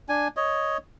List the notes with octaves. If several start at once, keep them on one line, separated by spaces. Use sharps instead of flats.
D4 G#5
C#5 D#5